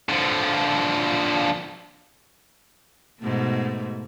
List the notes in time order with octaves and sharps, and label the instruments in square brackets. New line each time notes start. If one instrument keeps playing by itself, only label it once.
[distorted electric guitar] D3 F3
[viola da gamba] G#2 B2 A3